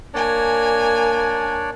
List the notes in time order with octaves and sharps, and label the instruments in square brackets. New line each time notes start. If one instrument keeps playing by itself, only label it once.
[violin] A#3 G#5 [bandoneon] D4 C#5 D5